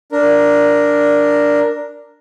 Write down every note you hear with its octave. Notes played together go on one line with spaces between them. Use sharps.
D4 A#4